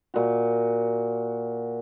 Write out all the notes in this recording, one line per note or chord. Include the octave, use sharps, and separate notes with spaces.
A#2 F#4